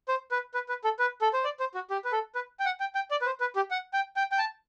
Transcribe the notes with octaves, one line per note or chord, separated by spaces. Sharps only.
C5
B4
B4
B4
A4
B4
A4
C5
D5
C5
F#4
G4
B4
A4
B4
G5
F#5
G5
G5
D5
B4
C5
B4
G4
F#5
G5
G5
G5
A5